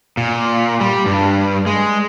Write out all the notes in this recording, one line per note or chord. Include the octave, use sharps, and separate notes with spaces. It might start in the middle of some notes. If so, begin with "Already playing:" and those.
A#2
G3
G2
G#3